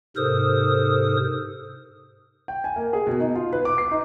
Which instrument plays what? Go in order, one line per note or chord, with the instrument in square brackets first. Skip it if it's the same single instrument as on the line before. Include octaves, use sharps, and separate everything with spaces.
[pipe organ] G#2 C3 A4 A#4 C5 D#6
[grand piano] G5
G#5
A#3
G#4
B2
D#4
F4
B4
D6
C7
D#4